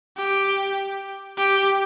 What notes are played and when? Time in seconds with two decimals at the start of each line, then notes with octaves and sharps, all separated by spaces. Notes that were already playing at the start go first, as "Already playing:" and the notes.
0.17 G4
1.38 G4